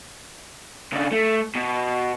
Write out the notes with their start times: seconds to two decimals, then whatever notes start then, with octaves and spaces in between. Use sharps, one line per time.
0.93 C#3 D4
1.12 A3
1.55 B2